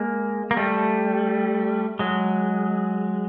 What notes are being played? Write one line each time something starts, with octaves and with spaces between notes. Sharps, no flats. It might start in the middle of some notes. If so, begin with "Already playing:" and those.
Already playing: G#3 A#3
A#3
G3 A3
F#3 G#3